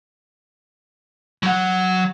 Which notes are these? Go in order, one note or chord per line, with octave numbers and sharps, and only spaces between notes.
F#3 F#5